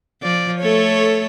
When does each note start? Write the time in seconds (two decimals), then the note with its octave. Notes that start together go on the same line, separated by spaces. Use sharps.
0.22 F3 D5
0.60 A3 A4 C#5